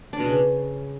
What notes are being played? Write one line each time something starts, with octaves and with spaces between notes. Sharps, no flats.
D4
B2
C#3